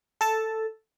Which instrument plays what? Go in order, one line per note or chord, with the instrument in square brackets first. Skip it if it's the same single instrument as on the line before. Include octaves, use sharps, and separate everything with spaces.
[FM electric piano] A4 A5